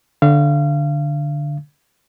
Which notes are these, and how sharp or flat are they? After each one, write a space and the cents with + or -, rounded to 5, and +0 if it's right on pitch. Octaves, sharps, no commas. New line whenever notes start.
D3 +0 F5 -30